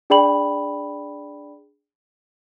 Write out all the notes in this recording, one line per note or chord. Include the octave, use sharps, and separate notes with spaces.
D4 G#4 D5 G5 B5 F#7